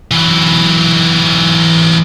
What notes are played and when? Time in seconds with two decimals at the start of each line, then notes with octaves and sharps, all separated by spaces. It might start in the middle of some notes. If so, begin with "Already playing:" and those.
0.11 E3 F#3